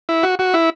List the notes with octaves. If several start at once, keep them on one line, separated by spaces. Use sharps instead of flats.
E4
F#4
F#4
E4